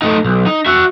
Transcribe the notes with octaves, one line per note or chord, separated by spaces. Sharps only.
A3 D#4
B1
D#4
F#4 E5